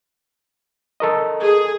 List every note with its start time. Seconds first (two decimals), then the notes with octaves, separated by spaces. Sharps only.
1.00 A4 A#4 D#5
1.41 G#4